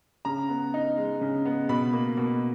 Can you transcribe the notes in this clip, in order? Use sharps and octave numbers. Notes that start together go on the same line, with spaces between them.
C#3 A#5
B3
D#4
G#3
C#3
B3
B2 B5
A#3
B2